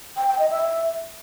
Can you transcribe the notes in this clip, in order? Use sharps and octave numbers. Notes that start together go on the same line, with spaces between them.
G5
G5
D#5
E5